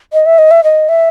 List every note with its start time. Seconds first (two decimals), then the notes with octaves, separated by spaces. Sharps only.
0.13 D#5
0.26 E5
0.38 D#5
0.51 E5
0.64 D#5
0.89 E5